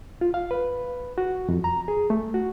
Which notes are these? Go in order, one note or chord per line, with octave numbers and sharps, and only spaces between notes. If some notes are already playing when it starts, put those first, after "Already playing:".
F4
F5
B4
F#4
F2
A#5
G#4
A3
F#4